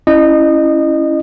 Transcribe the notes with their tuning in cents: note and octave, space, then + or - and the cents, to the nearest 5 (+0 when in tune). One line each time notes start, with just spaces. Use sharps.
C#4 +0 E4 +0 D#5 -25